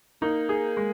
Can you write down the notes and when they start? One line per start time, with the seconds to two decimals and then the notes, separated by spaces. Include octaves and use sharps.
0.22 A#3 D#4
0.49 G#4
0.77 G#3